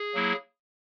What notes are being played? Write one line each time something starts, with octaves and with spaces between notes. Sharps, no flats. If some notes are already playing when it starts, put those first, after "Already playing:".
Already playing: G#4
F#3 A#3 E4